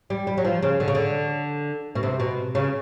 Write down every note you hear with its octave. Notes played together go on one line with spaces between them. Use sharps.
G3
G3
F#3
F3
C#3
D3
C#3
D3
B2
C3
B2
C#3